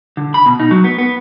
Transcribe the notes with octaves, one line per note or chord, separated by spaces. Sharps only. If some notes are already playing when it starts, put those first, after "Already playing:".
D3
B5
B2
D#4
F#3
B3
B3